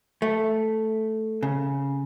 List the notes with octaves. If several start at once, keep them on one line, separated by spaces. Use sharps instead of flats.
A3
C#3